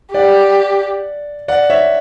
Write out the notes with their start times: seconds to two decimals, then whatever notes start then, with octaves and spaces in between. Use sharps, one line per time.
0.14 G4 D5 F#5
1.48 D5 F#5
1.70 C#5 E5